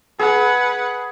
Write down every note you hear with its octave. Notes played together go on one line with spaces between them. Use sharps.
G#4 B4 F#5